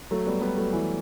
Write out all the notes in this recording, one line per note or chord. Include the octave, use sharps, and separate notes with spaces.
F#3 A3
G3 B3
G3 B3
F#3 A3
E3 G3